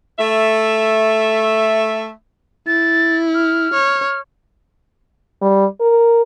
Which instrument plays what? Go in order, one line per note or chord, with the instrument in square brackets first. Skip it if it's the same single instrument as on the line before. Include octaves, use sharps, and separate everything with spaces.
[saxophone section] A3 E5
[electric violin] E4 [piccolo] A6
[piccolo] F6
[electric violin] C#5
[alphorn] G3
A#4